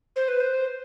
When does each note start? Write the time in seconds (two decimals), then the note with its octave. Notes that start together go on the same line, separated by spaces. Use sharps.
0.16 C5
0.28 B4
0.40 C5